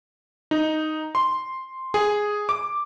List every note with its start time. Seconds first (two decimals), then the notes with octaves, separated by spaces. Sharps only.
0.51 D#4
1.15 C6
1.94 G#4
2.49 D6